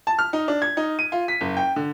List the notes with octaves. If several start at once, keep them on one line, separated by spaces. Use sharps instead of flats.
A5
F6
D#4
D4
G#6
D#4
D#7
F4
B6
F#1
G5
D3